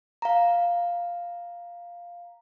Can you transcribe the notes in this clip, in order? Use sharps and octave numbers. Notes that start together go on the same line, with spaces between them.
F5 A#5